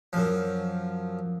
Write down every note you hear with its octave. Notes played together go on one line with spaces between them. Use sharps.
F#2 F3